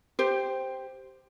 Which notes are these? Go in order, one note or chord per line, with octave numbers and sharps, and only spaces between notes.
G4 C5